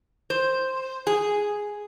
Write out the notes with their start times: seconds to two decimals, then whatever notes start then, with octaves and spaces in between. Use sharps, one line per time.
0.30 C5
1.07 G#4